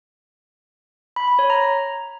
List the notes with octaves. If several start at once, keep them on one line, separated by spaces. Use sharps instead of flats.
B5
B5
C#5
A#5